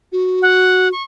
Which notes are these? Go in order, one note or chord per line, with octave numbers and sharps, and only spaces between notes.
F#4
F#5
C#6